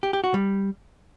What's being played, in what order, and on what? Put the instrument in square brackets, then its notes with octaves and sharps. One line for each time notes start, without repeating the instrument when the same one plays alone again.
[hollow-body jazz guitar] G4
G4
F#4
G3